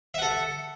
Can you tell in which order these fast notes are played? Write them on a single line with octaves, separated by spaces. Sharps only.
E5 F#5 A4